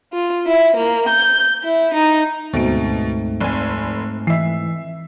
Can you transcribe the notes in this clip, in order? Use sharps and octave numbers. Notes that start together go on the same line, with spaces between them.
F4
E4
A#3
G6
E4
D#4
D2 G#2 B2 A3 C4 D7
F1 G#5
E3 E5 C7